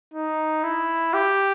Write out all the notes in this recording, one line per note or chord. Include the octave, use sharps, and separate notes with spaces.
D#4
E4
G4